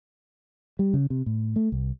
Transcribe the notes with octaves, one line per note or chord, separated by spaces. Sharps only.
G3
C#3
C3
A2
A3
C2